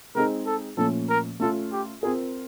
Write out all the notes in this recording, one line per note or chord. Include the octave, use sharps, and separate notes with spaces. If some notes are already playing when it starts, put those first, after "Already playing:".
G#3 C4 D#4 G#4 A#4
A4
A#2 F3 A3 C#4 A4
A#4
A3 C#4 F4 A4
G4
C4 F4 G#4 A#4